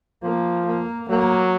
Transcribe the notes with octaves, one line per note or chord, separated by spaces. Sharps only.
F3 A#3
A#3
F#3 A#3